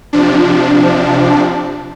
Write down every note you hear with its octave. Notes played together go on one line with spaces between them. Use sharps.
C3 F3 D4